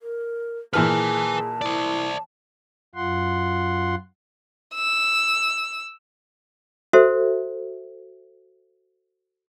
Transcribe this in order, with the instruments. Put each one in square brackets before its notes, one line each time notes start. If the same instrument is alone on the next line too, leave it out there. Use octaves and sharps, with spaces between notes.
[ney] A#4
[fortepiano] A#2 E3 F6 [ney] G#4 [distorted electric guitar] B4 G#5 [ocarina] A5
[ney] E4 [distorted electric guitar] C5 D5
[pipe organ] F#2 F4 F#5 C6
[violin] E6
[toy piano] F#4 A4 C5 E5